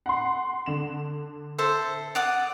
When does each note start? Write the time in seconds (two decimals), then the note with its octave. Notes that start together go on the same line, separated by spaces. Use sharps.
0.06 F#5 C6
0.66 D3 E7
1.58 A4 C5 E5
2.15 D5 F#5 D#6